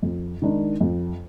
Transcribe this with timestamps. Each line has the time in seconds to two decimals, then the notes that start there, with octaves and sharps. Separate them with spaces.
0.03 F2
0.42 D#3 G#3 D4
0.81 F2